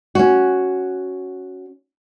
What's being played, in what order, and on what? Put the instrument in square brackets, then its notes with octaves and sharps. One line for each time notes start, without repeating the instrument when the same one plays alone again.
[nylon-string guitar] C#4 F#4